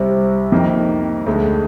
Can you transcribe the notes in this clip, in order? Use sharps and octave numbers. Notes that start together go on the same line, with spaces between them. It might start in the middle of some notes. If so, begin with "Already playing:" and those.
Already playing: C2 C3 G3 C4
F2 D#3 A#3 D#4
D2 D3 G#3